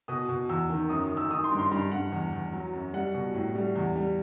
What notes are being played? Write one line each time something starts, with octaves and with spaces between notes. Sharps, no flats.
B2 D#6
B2
E2 E6
D#3
F#2 D#6
D#6
D#3
E6
D#3 D#6
C6
G2
C6
G2 B5
G2 F#5
E2
E2
F#3
F#2
G3 F#5
B2
A2
G3
E2
G3